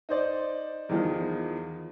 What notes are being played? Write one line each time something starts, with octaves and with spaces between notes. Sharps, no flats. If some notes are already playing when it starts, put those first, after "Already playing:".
D#4 C5 D5
E2 D#3 F3